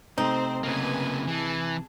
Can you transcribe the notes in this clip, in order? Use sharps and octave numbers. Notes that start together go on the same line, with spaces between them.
C3 A3 C4 D#4 C5
C#3 A#3 B4 G#5
E3 G#4 A5